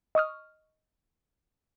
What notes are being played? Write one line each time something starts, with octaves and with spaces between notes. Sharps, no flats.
D#5 C#6 D#6 F6